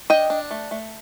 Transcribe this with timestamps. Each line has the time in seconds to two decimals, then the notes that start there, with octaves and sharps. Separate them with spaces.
0.10 D4 D#5 G5
0.30 D4
0.51 A3
0.71 A3